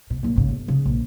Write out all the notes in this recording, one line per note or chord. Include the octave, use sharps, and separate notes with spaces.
B2
F#2 A#2
G#1 C#3
G1
C#3
A#1